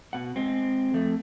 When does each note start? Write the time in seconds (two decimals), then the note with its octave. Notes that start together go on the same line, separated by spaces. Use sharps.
0.13 B2 F#5
0.36 G#3 C4
0.94 F2 A3